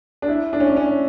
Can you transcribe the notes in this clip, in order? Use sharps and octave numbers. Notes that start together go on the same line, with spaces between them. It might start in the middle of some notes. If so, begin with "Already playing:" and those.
D4
E4
D4
C#4
D4
C#4